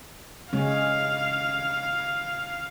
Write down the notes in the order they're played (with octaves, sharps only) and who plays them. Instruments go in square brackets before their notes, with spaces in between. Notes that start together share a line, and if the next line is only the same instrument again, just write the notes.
[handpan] C#3 G#3 C#4 [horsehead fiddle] F5